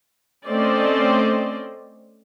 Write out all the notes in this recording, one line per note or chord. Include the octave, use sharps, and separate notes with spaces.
A3 C4 C#4 C5 D5 D#5